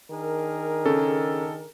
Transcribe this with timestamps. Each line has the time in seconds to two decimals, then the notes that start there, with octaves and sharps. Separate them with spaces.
0.11 D#3 D4 G#4 A#4
0.86 C#3 A4